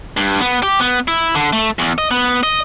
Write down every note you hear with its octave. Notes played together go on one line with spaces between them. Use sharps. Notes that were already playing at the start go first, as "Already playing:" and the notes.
G2
B3
G4
B3
E4
D3
A3
E2
D#5
B3
D#5